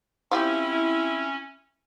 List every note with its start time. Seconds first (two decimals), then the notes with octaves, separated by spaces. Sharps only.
0.31 F3 G3 C4 C#4 E4 G4